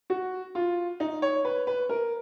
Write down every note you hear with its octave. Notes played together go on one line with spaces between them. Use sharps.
F#4
F4
D#4
C#5
B4
B4
A#4